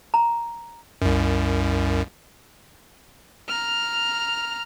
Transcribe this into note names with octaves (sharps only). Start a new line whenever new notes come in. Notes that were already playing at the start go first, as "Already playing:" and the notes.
A#5
C2 F#2
A#5 F6